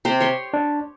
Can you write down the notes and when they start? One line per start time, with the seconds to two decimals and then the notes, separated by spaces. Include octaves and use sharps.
0.05 C3 G4 C5
0.20 C#5 C6
0.54 D4